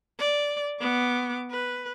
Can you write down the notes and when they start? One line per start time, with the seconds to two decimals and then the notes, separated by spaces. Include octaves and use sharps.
0.20 D5
0.80 B3 D6
1.51 B4